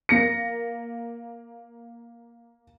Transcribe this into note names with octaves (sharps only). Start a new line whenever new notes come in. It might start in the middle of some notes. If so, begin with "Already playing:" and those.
A#3 A#6 C#7